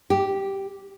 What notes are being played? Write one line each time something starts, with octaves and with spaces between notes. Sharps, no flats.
G4